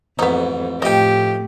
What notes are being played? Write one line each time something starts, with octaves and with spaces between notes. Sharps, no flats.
A1 F2 G#2 B3 D#4
A2 F3 A3 D#4 G4 D#5 G5